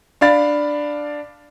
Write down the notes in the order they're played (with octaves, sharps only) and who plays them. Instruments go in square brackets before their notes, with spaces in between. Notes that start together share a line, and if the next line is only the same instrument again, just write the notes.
[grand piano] D4 D5 F5 B5 A6